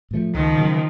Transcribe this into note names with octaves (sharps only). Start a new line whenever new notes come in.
A2 F3 A3
C#2 D#3 F3
C#3 F#3 A#3